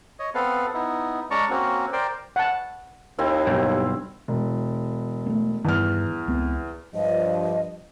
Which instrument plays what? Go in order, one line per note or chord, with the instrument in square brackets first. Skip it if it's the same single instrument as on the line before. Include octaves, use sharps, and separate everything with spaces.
[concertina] C#5 D#5
B3 C4 A4 B4 F5
B3 D#4 E4
G#3 C#4 D5 A5 A#5 C#6
A#3 C4 C#4 F#4
A#4 C5 D5 G5
[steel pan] F#5 A5
[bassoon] D#2 [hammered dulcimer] C4 E4 F5
[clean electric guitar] B1 G2
[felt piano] E1
[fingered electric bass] A3 B3
[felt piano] E2 F6 [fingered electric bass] G2 D#3
[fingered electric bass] C#2 B3 C4
[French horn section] G2 F3 [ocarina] D#5